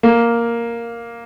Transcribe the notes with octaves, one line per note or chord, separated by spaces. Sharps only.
A#3